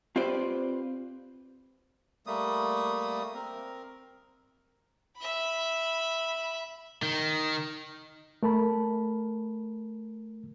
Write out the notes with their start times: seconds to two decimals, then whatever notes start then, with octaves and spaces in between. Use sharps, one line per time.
0.16 C4 F4 G4 B4 C5 D5
2.27 G3 A3 A#3 D#6
3.34 C4 A#4
5.17 E5 B5
7.03 D#3
8.43 A3 A#4 A5 B5